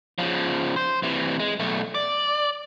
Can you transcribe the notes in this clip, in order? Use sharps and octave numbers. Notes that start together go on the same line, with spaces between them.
C#3 F3
C5
C3 E3
G#3
B1 A3
D5